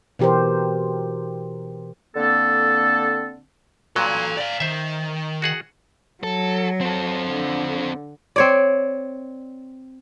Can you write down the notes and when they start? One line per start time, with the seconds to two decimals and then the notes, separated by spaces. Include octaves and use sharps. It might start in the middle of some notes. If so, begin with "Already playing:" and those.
0.19 B2 E3 G4 A#4 C5
2.15 D3 A#3 C4 A4
3.96 G2 A#2 F#3 A4 C6
4.37 D5 F5
4.60 D#3 C5 E5
5.42 F#4 G#4 F#5
6.23 F#3 A4
6.81 C4 A4
7.28 D3
8.36 C4 C#5 D5